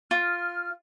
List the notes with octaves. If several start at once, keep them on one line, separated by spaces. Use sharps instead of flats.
F4 F6